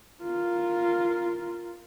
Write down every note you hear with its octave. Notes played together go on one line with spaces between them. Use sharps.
F4 A#4